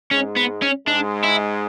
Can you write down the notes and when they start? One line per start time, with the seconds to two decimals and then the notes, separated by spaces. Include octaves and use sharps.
0.11 G#2 G#3 C#4
0.36 B3
0.62 C#4
0.87 G#2 G#3 D4
1.24 E4